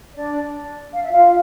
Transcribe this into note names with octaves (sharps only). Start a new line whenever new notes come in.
D4 D5
F5
E5
F4 F5